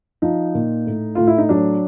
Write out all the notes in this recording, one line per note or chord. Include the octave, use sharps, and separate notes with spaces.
F3 D#4
A#2
A2
A2 F4
E4
D#4
F#3 D4